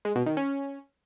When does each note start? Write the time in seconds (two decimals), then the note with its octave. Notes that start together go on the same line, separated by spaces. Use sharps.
0.05 G#3
0.16 B2
0.26 D#3
0.37 C#4